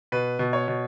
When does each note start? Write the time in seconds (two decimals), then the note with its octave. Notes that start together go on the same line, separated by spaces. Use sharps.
0.12 B2 B4
0.39 B2
0.53 C#5
0.68 B2